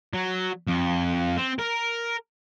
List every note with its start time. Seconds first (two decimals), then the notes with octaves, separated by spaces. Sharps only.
0.14 F#3
0.67 F2
1.37 C4
1.59 A#4